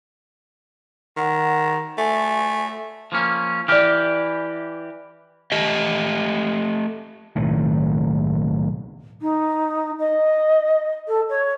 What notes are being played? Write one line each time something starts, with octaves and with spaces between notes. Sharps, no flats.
D#3 F#5
A3 G#5
F3 A#3 C#4
E3 G4 D5 F6
A3 G4 D#5
B1 A2 D#3
D#4
D#5
A4
C#5